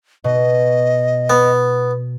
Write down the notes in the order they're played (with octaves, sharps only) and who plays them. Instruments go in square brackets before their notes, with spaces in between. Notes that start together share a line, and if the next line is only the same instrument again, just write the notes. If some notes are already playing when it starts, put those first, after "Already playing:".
[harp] B2 [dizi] D#5
[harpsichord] B3